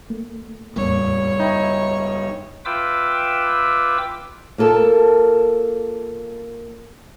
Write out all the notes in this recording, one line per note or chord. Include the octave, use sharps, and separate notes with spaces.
A3 A#3
F#1 E2 A2 G3 A#3 C#5
D#4 E5 G5 B5
F4 B4 E5 G5 D6 E6
A#3 F4 A4 A#4 A5